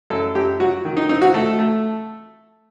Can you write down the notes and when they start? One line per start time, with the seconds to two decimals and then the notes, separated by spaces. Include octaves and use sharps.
0.10 F#2 A4
0.35 F#2 G4
0.60 F#3 F#4
0.85 D#3
0.97 D#4
1.09 C4 D#4
1.22 F#4
1.34 A3 A4
1.59 A3